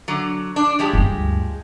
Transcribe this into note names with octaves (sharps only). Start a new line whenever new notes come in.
D3 F#3
D4
F3 G#3 G4
D2 G2